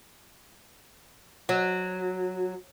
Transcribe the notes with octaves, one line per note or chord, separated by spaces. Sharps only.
F#3